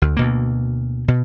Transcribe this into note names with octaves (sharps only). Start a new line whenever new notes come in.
D2
D2 B2 A#3
B2